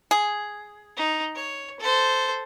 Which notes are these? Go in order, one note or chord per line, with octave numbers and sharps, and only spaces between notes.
G#4
D#4
C#5
A4 C5